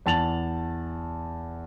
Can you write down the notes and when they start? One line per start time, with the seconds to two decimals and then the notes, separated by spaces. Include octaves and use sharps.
0.06 E2 A5 A6 F7 F#7